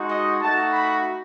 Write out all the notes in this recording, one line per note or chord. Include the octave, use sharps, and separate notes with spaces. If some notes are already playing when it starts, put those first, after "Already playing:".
Already playing: G#3 D#4 F#4
D#5
A3 D#4 F#4 A5
B5